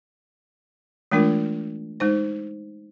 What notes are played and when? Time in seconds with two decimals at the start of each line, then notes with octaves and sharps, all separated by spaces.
1.12 E3 G#3 A3 D4 F4 A#4
2.00 G#3 D#4 C5